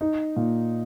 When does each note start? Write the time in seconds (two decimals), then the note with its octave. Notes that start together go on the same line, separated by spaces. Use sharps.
0.01 D#4
0.36 A#2